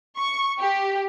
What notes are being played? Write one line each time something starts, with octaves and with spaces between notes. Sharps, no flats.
C#6
G4